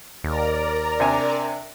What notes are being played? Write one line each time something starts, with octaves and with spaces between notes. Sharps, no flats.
D#2 A#4 D5 A#5
C3 D4 G#5